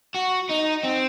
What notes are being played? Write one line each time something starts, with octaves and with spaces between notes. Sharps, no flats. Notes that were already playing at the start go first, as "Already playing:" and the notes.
F#4
D#4
C4